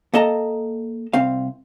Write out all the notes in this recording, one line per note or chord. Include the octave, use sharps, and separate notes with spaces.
A#3 A4 D#5 A5 A#5
C2 C4 F5